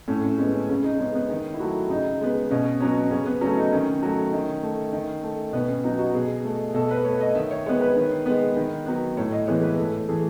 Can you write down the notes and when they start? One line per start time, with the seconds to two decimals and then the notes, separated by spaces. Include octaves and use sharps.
0.08 A2 C#4
0.23 C#4
0.38 G#3 B3 C#4
0.54 C#4
0.69 C#3 C#4
0.84 D#4
0.99 G#3 B3 C#4
1.15 B3
1.30 D#3
1.54 E4
1.59 F#3 A3 F#4
1.90 C#3 D#4
2.21 G#3 B3
2.51 B2 C#4
2.80 F#3 B3 C#4
3.11 C#3 C#4
3.26 B3
3.41 F#3 A3 C#4
3.57 D#4
3.72 D#3 C#4
4.02 F#3 A3
4.33 D#3
4.63 A3
4.93 D#3
5.23 A3
5.53 B2 B3
5.68 C#4
5.84 F#3 B3 D#4
5.99 F#4
6.14 B2 G#4
6.45 A3
6.74 B2 A4
6.91 B4
7.05 A3 C#5
7.20 D#5
7.35 D#3 E5
7.51 C#5
7.66 G#3 B3 C#5
7.81 B4
7.97 D#3
8.26 G#3 B3
8.57 D#3
8.86 F#3 B3
9.17 A2 C#5
9.32 D#5
9.47 E3 G#3 B3 C#5
9.63 B4
9.77 A2 A4
10.08 E3 A3 G#4